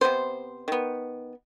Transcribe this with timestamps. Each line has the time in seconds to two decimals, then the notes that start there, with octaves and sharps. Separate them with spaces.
0.01 C3 G3 B3 C5
0.68 D#3 B3